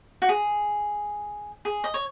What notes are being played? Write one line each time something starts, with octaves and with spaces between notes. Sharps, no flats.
F#4
G#4
G#4
D#5
C#5